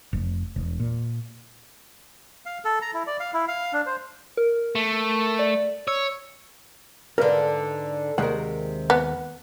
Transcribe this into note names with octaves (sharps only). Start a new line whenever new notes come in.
F1
E1
A#2
F5
A4
A#5
E4
D5
F5
E4
F5
D4
C5
A#4
A3
D5
C#5 E6
G#2 D3 A#4 B4 F5
D#2 C3 G#3 A#4 F#5
B3